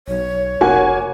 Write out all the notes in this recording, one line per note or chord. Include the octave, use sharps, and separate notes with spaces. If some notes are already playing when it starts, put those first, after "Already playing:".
B1 C#5
F1 A#3 F#4 G#5